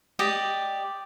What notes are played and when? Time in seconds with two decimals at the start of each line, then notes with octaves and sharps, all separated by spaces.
0.19 G4 D5 D#5